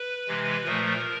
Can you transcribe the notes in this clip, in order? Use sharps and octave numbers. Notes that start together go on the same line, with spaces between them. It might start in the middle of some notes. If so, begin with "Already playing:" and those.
Already playing: B4
C3 E3 G#3
A#2 F3 A3 A#4